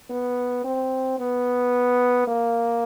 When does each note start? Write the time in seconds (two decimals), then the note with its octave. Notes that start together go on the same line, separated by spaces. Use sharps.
0.10 B3
0.64 C4
1.19 B3
2.27 A#3